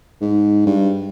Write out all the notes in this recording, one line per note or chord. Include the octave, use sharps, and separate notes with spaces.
G#2
G2